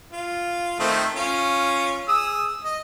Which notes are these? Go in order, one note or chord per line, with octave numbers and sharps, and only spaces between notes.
F4
D#3 A3 C4
C#4 F4
G#4 D#6 E6
D#5